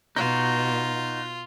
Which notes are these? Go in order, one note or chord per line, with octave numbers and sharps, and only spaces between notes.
B2 D#4 F4 F#4